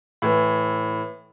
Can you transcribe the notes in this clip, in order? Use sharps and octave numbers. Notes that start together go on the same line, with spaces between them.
A2 E3